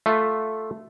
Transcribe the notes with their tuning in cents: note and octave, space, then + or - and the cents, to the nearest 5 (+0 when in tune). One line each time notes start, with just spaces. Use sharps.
A3 +0 F4 +0 E5 +0